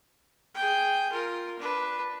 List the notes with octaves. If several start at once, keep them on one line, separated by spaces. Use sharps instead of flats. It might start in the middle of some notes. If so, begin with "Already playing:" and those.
G#4 G5
F4 A#4
D4 B4